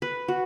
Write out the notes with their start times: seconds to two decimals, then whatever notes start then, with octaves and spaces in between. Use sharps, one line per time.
0.02 B4
0.28 F#4